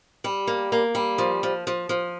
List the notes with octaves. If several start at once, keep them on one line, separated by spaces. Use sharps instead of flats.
G3
A#3
A#3
G3
F3
F3
F3
F3